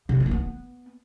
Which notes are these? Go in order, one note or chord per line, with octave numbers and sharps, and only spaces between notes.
C#3
D3
C#4
D4
B3